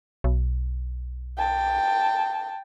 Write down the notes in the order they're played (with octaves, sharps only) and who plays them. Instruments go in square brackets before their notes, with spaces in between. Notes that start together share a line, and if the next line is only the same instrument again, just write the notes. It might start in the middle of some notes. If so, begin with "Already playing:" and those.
[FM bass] B1
[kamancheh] G5 A5